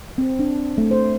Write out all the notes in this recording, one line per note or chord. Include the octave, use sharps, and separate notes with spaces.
C4
D4
A3
C5